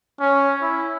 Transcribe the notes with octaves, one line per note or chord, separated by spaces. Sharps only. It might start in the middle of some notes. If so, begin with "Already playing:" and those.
C#4
E4